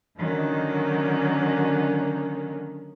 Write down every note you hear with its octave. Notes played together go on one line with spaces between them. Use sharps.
D3 D#3 F#3 A#3 C#4